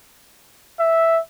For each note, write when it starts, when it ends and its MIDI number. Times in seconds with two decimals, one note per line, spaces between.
0.78 1.18 76